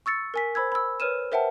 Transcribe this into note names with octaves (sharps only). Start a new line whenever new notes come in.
C#6 E6 A6 C#7
A#4 G#5 B6
C5 B5 E6 G#6
B5 E6
B4 C#5 F6 D#7 E7
A#4 C5 E5 F#5 G5 A5